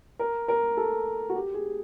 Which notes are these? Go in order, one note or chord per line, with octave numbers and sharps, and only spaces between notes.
A#4
A#4
A4
F#4
G4
G#4